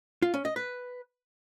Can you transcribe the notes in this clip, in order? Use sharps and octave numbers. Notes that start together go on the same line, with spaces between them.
F4
C#4
D#5
B4